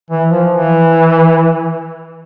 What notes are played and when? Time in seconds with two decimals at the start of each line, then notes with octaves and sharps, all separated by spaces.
0.10 E3
0.31 F3
0.49 E3